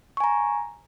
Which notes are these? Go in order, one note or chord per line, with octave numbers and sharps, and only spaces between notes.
G#5 A#5 C#6